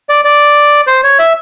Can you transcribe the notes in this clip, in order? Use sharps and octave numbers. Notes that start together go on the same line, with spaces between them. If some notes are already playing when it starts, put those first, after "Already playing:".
D5
D5
C5
C#5
E5